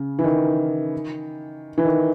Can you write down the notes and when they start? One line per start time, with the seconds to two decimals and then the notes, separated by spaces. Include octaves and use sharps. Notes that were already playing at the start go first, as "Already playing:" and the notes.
Already playing: C#3
0.19 E3
0.24 D#3
1.78 E3
1.85 D#3